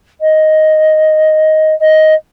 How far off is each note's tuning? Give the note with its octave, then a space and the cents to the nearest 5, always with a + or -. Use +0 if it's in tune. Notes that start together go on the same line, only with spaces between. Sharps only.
D#5 +5
D#5 +10